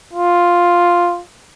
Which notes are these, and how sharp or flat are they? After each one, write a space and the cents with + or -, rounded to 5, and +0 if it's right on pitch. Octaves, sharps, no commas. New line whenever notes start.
F4 +5